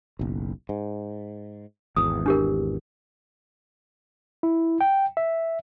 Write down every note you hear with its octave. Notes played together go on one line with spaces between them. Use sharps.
F#1 B1
G#2
G#1 E2 D#6
D4 G4 A#4
E4
G5
E5